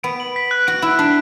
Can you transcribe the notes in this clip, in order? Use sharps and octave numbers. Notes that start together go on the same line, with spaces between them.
B3 D7
F#7
B6
F#6
F#4 D7
E4 F#7
D4 B6